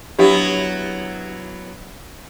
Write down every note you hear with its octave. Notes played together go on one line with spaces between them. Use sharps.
F#3 B3 D4 E4 G4